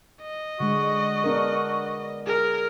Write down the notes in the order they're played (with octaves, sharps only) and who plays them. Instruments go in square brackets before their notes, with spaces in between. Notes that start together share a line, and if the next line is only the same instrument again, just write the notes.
[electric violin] D#5
[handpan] D3 G#3 [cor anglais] F#4
[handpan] B3 D4 A#4
[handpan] G#4 [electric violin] A#4